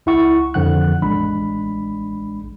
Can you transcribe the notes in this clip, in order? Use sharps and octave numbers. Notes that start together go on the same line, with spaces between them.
C#2 E4 F#5 C#6
F2 D3 F3 F#5 F#6
A1 G#3 D4 B5